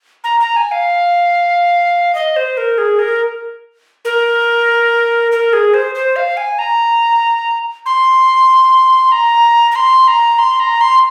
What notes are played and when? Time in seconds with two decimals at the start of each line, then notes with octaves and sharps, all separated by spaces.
0.24 A#5
0.40 A#5
0.56 G#5
0.72 F5
2.15 D#5
2.36 C5
2.57 A#4
2.78 G#4
2.99 A#4
4.05 A#4
5.32 A#4
5.53 G#4
5.74 C5
5.95 C5
6.16 F5
6.37 G#5
6.59 A#5
7.86 C6
9.12 A#5
9.72 A#5
9.76 C6
10.08 A#5
10.39 C6
10.60 A#5
10.81 C6